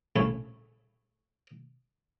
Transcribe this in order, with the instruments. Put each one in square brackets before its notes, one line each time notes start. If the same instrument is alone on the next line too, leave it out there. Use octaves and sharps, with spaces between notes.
[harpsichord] A#1 C#3 A3 C#4 E4